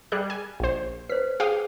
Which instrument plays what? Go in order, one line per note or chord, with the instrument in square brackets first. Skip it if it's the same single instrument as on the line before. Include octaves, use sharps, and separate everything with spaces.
[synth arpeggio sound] G3 G#4 F#6
G#5
A#1 C5
[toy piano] B4 C5 [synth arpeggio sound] B6
[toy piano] G#4 [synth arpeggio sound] F5 G5 D#6